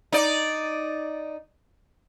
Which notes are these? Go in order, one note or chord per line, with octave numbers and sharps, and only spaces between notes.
D#4 D5